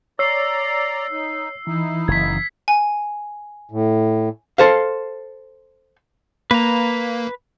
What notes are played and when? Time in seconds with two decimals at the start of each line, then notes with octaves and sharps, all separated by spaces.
0.19 C#5 D5 A#5 E6 C7
1.12 D#4
1.67 E3 D#4 E4
2.08 F#1 G#6 B6
2.68 G#5
3.71 A2
4.58 A4 C5 F5
6.51 A#3 B4 A#5